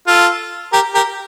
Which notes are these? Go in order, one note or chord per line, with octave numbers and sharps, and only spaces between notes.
F4 A4
G4 A#4
G4 A#4